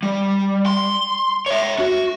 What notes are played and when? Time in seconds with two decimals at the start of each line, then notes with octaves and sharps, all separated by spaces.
0.03 G3
0.66 C6
1.46 C#5 E5
1.79 F#4